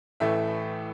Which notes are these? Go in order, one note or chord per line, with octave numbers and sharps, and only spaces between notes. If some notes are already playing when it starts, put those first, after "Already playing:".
A1 A2 E3 A3 E5